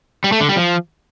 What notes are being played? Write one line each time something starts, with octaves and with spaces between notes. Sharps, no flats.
G3
A3
D3
G3
F3